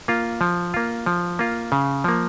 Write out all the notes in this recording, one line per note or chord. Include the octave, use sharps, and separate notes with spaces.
A#3 F4
F3
A#3 F4
F3
A#3 F4
C#3
F3 A#3